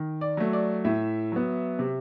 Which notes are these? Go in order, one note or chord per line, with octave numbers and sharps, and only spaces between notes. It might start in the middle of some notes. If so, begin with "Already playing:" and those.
Already playing: D#3
D5
F#3 A3
D5
A2 E5
F#3 B3
C3